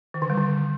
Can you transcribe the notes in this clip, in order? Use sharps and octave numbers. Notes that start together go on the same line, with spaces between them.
D#3
D3
G3
D3